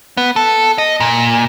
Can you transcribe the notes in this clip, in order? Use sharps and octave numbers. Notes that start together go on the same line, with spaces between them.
B3
A4
D#5
A#2